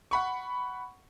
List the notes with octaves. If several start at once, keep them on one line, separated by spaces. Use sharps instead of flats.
F#5 B5 C#6